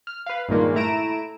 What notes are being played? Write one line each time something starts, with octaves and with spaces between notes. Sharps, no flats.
F6
B4 F5
G2 A#2 D#3 G#3 A#3
A3 E4 A#5 D7 E7